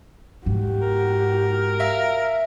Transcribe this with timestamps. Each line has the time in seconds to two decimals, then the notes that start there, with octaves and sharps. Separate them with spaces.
0.46 G#2 F#4 G4
0.81 A#4
1.80 E5 F5